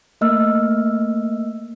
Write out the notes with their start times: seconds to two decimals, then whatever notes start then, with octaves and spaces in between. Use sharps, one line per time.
0.21 A3 A#3 D#5 E6 F6